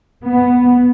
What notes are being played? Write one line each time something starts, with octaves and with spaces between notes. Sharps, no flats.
B3